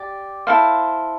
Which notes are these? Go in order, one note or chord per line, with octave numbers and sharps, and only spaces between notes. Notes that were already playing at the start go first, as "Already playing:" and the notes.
Already playing: G4 D5
E4 A4 C5 F5